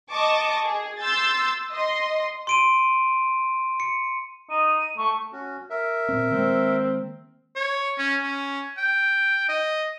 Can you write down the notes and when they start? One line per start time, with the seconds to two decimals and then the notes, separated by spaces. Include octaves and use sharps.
0.10 D#5 A5 C#6 D6
0.65 G#4
1.00 C6 E6 G6 A6
1.71 D#5 C6
2.47 C6 D7 D#7
3.80 C#7
4.50 D#4 D#7
4.98 A3 C#6
5.33 C#4 F#4
5.70 A#4 E5
6.09 A#2 C4
6.30 D#3 G#3 A#3 C4
7.56 C#5
7.98 C#4
8.22 C#4
8.78 G5
9.49 D#5